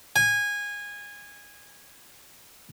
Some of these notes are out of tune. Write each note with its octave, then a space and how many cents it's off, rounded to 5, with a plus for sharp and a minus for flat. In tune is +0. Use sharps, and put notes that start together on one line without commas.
G#5 -20